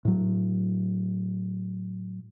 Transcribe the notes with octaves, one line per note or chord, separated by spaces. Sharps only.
A2 F#3